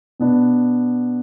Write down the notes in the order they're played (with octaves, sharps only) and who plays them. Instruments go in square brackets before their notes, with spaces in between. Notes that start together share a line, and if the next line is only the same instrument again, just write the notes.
[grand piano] B2 B3 D4